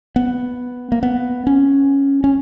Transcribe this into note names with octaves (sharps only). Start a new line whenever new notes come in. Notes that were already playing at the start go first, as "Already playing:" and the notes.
B3
A#3
B3
C#4
C#4